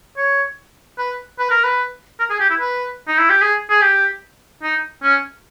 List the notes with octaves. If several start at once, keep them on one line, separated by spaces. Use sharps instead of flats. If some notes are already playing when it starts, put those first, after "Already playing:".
C#5
B4
B4
A#4
B4
A#4
G#4
G4
E4
B4
D#4
E4
G4
G#4
G#4
G4
D#4
C#4